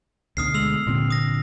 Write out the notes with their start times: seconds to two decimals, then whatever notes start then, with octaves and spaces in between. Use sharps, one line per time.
0.37 D2 B2 D3 D#6 F6 C7
0.54 G#3 E6 F7 F#7
0.87 F1 A#2 D3 C4
1.10 D#6 A#6